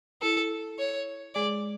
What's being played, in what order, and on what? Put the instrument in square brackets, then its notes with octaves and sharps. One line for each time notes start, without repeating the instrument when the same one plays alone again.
[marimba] E4 [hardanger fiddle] A4
[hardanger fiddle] C#5
[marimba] G#3 G#4 [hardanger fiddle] D5